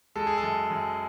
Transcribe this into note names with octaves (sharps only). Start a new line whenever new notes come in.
G#3 A4
G#4
A4
F#2
F#2